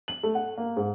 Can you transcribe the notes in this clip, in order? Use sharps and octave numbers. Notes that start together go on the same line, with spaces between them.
F#7
A3
F#5
A#3
G#2